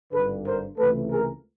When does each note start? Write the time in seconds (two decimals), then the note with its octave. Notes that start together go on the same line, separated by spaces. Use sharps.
0.12 G#1 G2 D3 A4 B4
0.45 A#4 C5
0.77 C#2 C3 E3 A3 A4 B4
1.11 G#4 A#4